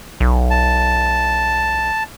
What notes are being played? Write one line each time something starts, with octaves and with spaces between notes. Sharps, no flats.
B1
A5